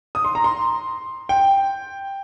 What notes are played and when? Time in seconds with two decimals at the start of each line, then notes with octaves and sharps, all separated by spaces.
0.15 D#6
0.24 C6
0.35 A#5
0.44 C6
1.29 G5